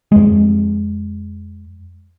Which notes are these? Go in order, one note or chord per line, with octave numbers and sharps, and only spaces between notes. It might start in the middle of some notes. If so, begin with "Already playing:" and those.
F2 G#3